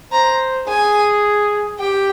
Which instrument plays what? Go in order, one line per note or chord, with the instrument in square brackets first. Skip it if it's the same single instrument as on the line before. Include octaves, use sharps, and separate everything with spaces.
[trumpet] C5 [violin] A#5
[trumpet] G#4 [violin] G#5
[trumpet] G4 [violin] G5